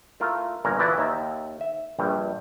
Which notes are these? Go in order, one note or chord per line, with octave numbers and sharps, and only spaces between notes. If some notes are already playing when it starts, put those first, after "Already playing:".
A3 E4 F4 A#4
G1 A#2 A#4 C#5 A#5
E3 F3 E4 F#4 B4 D5
D#2 D#3 E5 A#5
E5
A#1 G2 G3